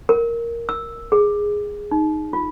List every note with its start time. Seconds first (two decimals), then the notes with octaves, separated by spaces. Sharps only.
0.09 A#4
0.69 E6
1.12 G#4
1.91 D#4
2.33 F4